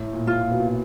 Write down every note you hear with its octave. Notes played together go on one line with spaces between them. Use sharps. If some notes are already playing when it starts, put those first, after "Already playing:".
Already playing: A2
A#2
F4
A#2
B2
A#2